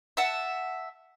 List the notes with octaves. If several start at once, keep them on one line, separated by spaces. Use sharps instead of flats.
E5 F#5 A5